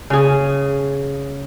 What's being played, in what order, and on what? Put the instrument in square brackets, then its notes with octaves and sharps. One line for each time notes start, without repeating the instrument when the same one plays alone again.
[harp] C#3 G#4